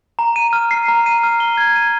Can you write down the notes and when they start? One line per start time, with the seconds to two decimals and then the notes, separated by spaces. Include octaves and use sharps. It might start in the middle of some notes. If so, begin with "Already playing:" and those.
0.19 A#5
0.36 D#7
0.53 F6
0.71 C7
0.88 A#5
1.06 D#7
1.23 F6
1.40 G7
1.57 G#6
1.76 D#7